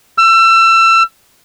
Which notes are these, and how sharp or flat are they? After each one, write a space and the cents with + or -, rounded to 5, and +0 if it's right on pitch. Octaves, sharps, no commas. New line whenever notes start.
E6 +30